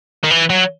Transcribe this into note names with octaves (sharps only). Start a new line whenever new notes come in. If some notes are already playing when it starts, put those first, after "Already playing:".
D#3
E3
F#3